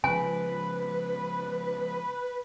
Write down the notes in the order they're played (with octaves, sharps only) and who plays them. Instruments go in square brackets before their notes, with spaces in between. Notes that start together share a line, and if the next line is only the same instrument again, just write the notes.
[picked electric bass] C#3 F3 G#3 [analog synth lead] B4 [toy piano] G#5